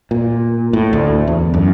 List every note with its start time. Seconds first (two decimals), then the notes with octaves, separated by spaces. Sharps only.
0.11 A#2
0.73 A2
0.93 D2
1.27 E2
1.54 F#2